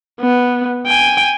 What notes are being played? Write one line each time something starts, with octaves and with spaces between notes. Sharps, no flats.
B3
G5 G#5